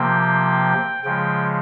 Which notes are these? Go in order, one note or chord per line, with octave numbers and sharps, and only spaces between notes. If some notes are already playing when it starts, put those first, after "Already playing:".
Already playing: C3 F3 A#3 G5
C#3 F3 G#3 G5